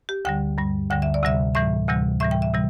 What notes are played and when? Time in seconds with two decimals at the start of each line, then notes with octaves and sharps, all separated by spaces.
0.09 G4
0.25 D2 D3 G3 G5
0.58 G2 G3
0.90 D2 D3 G3 G5
1.02 E5
1.14 D5
1.23 D2 C3 G3 E5
1.55 A2 E3 G3 E5
1.88 D2 C3 E3 G3
2.20 A2 E3 G3 E5
2.31 G5
2.42 E5
2.54 C3 E3 G3